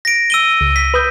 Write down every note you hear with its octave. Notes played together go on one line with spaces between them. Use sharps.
A#6 D7
E6 D#7 G7
C#2
B6
B4 D#6 G6